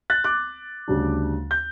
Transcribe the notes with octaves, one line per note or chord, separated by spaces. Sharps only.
F#6 A6
D6 F#6
D2 C#3 G3 D4
G6